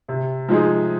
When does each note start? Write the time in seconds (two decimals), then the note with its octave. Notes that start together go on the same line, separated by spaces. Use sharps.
0.08 C3
0.48 F3 G#3 D#4 G#4